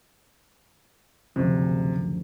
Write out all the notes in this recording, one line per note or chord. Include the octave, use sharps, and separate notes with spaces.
F#1 D2 C3 F3